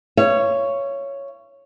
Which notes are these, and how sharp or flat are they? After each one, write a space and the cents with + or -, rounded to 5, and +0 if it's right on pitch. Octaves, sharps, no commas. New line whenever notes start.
C#5 +0 F5 -40